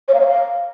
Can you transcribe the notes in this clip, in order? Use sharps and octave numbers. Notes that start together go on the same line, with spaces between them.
C#5
F5
C#5
F5